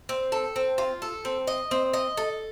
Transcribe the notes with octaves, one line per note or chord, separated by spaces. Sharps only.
C4
A4
C4
F4
A4
C4
D#5
C4
D#5
A4